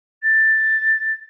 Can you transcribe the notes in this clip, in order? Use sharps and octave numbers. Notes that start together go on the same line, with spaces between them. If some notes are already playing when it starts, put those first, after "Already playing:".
A6